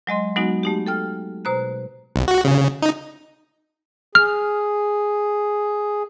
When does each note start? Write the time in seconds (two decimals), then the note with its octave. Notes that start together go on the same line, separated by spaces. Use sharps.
0.07 F#3 G#3 D#5 C6
0.36 F#3 G#3 B3 D#4 F#4
0.63 A3 D#4 G4
0.87 A4 G5 F6
1.45 B2 C5 A#5 F#6
2.16 C2
2.28 F#4
2.45 C#3
2.82 D#4
4.15 G#4 F6